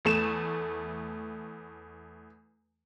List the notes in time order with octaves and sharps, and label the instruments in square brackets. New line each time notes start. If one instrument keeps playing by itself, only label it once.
[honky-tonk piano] E2 A3 E7